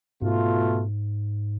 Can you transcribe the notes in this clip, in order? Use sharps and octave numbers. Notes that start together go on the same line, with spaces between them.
G#2 B2 A3 F4